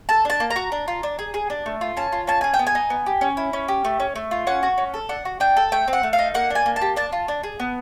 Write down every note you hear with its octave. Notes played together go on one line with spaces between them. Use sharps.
A4 A5
D4 A5
A#3
A#5
F#4
D4
F4
D4
G#4
G#4
D4
A3
F4
C#4 A5
F4
C#4 A5
G#4 G#5
G5
B3
G#5
D#4
B3
G4
C#4
E4
C#4
G4
A3
C#4
A3
F4
C#4 F#5
F#4
C#4
A4
D4 F#5
F#4
D4 G5
A4
A3 G5
C4
F#5
A3
F5
D#4
A#3 F#5
D4 G#5
A#3
A5
G4
D4 A5
F4
D4
G#4
B3